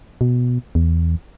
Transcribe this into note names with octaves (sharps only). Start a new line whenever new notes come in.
B2
E2